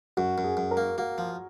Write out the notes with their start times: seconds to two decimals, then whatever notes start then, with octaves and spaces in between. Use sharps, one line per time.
0.17 F#2 F#4
0.38 F#2
0.44 G#4
0.57 F#2
0.71 A#4
0.77 A#3
0.98 A#3 F#4
1.18 F3